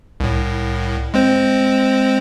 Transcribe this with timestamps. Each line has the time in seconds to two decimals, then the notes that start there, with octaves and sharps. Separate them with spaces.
0.20 C2 A2
1.14 G#3 C4 C5